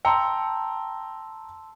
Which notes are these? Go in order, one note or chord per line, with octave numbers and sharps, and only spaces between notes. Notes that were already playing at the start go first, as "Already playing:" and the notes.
G5 A5 A#5 C6 E6 C#7